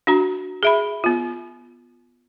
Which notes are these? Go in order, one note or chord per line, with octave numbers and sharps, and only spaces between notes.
D4 F#4 A#5
G#4 E5 B5
B3 F4